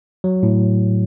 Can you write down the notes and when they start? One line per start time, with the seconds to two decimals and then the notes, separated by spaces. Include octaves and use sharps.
0.24 F#3
0.43 A2